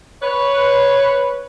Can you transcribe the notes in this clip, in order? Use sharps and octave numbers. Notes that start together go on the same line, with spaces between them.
B4 C#5